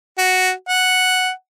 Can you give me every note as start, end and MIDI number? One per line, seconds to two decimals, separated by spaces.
0.18 0.52 66
0.69 1.30 78